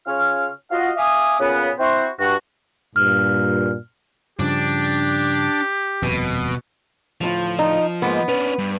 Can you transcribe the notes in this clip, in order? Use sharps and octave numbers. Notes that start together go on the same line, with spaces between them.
C#3 C#4 F4 C#5 F6
F4 F#4 D#5 F5
E5 F5 G#5 D6 D#6
A#2 C#3 B3
C4 E4 F#4 C5
G2 F#4
G2 A#2 F6
G2 C#3 F3 D4 G4
D#1 F2 B2
D2 A2 F3 F4
D#4
G#2 G#3 A#3 B3
C#4 D4 B4
G2